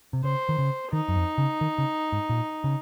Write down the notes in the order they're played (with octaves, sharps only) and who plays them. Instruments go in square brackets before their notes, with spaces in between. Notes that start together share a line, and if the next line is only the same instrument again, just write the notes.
[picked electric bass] C3
[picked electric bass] C#3 [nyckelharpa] C5
[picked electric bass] D#3
C#3
[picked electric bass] D#3 [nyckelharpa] D#4
[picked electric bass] F#2
F2
C#3
D#3
C#3
G#2
A#2
C#3